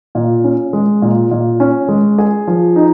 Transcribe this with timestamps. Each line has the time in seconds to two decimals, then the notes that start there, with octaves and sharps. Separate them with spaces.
0.15 A#2
0.44 C#4
0.73 G#3
1.02 A#2
1.31 A#2
1.60 C#4
1.88 G#3
2.18 G#4
2.47 F3
2.76 D#4